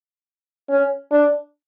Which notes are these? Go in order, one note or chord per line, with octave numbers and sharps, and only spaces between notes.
C#4
D4